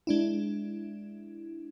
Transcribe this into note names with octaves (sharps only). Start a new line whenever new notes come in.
G#3 D4 E4